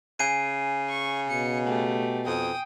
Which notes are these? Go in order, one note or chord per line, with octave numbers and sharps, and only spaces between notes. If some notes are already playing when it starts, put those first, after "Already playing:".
C#3 G#5 C7 D#7
C#6
B2 C#7
A3 G4
F2 G5 D#6